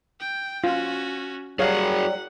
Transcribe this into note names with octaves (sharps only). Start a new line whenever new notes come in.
G5
C#4 F4 F#4
F#3 G3 F#4 G#4 C#5 F5 F#5